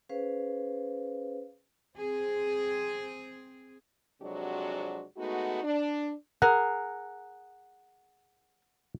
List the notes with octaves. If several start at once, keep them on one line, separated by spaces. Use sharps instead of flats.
C#4 G#4 B4 C5 F5
C4 G#4
F2 C3 F#3 G#3 D4 F#4
G#3 A3 B3 D#4 F#4
D4
G#4 A#4 F#5